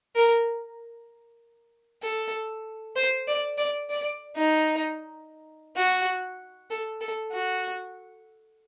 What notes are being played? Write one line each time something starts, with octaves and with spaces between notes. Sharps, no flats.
A#4
A4
C5
D5
D5
D5
D#4
F#4
A4
A4
F#4